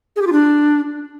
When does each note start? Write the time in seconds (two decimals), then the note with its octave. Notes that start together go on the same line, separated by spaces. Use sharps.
0.16 G#4
0.22 G4
0.27 F4
0.32 D4